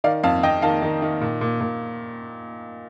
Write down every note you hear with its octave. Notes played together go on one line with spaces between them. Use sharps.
D#3 D5 F5
F2 F5 A5
F2 D#5 G5
D#3 F5 A5
D#3
D#3
A#2
A#2
A#2